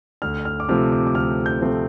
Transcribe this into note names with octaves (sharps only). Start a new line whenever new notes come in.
D2 F6
F6
D6
C3 F3 A3 C4 F6
D6
D6
D2 F6
G6
C3 F3 A3 C4